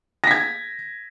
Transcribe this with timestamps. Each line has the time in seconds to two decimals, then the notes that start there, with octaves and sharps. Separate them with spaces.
0.24 A#6
0.27 B6
0.31 G#6